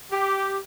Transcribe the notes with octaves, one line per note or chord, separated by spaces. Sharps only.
G4